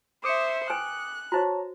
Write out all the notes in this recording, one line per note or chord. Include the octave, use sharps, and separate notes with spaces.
C5 E5 D6 D#6 C#7
B4 G5 G#5 F#6
F#4 C5 C#5 A5 A#5